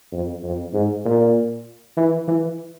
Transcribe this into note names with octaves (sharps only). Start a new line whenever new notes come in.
F2
F2
G#2
A#2
E3
E3